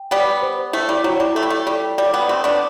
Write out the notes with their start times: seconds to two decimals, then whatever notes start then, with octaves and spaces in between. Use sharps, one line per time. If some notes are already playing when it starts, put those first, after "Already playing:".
Already playing: G5
0.11 G3 B3 G5
0.42 C5
0.73 A3 E4
0.89 G3
1.04 F#3 E4
1.20 G3
1.35 A3 A4
1.43 G3
1.50 A3
1.66 G3 A4
1.98 G3 D5
2.13 G3 B3
2.28 A3 C4 D5
2.44 B3 D4